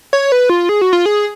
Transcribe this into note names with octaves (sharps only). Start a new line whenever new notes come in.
C#5
B4
F4
G#4
F#4
F4
G#4